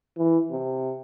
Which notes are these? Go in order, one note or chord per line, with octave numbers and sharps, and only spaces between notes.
E3
C3